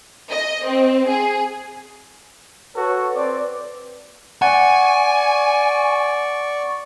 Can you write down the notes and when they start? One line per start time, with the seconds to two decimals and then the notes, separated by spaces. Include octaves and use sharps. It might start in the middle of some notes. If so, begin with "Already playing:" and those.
0.30 D#5
0.65 C4
1.08 G#4
2.76 F#4 A4 B4 C#5
3.16 C4 D5
4.42 D5 F#5 G#5 C#6